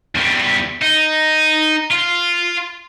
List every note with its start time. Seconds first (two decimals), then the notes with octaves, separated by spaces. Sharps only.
0.15 E2 G3
0.82 D#4
1.91 F4